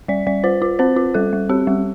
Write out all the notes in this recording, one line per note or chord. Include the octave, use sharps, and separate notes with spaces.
G3 D5
G3 D5
F4 C5
F4
C4 C5
F4
G3 A4
G3
C4 G4
G3